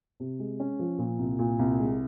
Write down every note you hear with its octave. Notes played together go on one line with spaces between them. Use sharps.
C3
G#3
C#4
F3
A#2
C2
A#2
C2
G#3